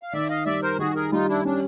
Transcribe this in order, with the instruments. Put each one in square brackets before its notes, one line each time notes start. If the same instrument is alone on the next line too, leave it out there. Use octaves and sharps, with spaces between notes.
[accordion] F5
[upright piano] D#3 [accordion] D5 E5
[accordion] D#5 F5
[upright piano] G3 [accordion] D5 E5
[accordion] A#4 C5
[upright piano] D#3 [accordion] F#4 G#4
[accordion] G#4 A#4
[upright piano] G3 [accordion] D#4 F4
[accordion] D4 E4
[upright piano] C#4 [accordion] D4